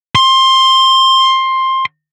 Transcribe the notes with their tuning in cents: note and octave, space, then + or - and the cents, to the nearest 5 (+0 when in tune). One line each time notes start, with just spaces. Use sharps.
C6 +15